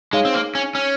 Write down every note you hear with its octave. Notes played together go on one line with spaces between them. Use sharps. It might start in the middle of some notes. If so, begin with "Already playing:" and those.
G#3 D#4 G#4 C#5 F5
C4
A#3
C#4
C#4